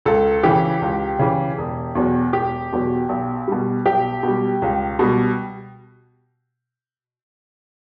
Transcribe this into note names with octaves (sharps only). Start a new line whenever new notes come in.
C#2 A4
C#3 E3 G4
C#2
C#3 E3
E1
E2 B2 F#3
E1 G4
E2 B2 F#3
B1
B2 G3
B1 G4
B2 G3
C#2
B2 G3